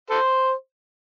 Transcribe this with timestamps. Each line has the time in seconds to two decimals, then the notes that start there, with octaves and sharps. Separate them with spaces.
0.10 A4 C5